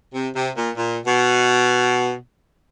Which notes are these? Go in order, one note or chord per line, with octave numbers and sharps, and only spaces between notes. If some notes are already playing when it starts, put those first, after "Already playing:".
C3
C3
A#2
A#2
B2